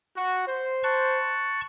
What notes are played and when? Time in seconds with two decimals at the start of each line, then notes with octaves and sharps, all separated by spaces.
0.16 F#4
0.47 C5
0.83 A5 C#6 F#6